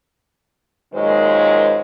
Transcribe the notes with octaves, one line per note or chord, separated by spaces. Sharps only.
F#2 A#2 D#3 G#3 C5